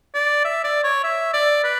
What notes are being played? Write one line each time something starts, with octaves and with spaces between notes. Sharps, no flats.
D5
E5
D5
C#5
E5
D5
B4